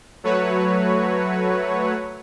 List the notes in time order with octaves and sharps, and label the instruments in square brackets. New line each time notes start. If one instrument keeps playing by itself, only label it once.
[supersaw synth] F#3 A3 F#4 B4 C#5